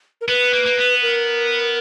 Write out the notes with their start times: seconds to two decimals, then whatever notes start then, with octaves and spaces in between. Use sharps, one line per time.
0.21 A#4
0.28 B3 B4
0.53 A#3
0.66 A#3
0.77 B3
1.02 A#4